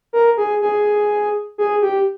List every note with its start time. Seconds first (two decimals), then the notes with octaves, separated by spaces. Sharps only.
0.13 A#4
0.37 G#4
0.62 G#4
1.58 G#4
1.82 G4